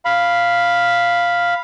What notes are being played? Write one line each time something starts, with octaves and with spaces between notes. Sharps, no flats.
F5 B5